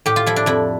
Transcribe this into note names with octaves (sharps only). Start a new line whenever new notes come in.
A2 G4
F4
F3 E4
D4
F2 E4